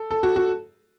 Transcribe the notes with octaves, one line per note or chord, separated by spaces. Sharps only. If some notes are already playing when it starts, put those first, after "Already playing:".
Already playing: A4
A4
F#4
F#4